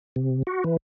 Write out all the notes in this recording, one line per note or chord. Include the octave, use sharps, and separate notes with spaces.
C3
F#4
E3